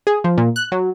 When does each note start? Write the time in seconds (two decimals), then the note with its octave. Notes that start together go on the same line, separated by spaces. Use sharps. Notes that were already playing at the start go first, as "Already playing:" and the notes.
0.07 G#4
0.24 F3
0.38 A#2
0.56 F#6
0.72 F#3